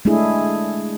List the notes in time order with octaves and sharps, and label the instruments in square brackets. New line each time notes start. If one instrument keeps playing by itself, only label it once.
[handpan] G#3 A3 D4 E4 G#4